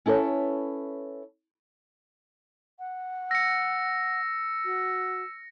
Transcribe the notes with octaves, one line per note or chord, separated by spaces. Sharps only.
C#4 E4 A4 B4 C#5
F#5
E6 A#6 C#7
F#4